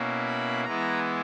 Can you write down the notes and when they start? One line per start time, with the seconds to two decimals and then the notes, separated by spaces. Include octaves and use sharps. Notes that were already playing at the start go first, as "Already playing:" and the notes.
Already playing: B2 A#3 C#4 E4
0.26 B5
0.64 E3 G#3 B3 E4 A#5